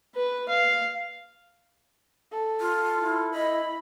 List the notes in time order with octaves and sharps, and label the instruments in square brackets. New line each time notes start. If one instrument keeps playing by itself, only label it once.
[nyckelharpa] B4
F5
[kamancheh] A4
[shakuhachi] F4
[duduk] E4
[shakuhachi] D#5 [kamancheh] B5